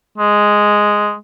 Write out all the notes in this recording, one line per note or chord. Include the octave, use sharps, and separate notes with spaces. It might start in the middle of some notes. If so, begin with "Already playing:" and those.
G#3